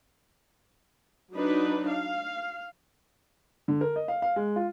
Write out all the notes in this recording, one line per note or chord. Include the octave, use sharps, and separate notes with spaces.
F#3 D4 D#4 B4
F5
D3
A#4
D#5
F5
F5
G#3
F4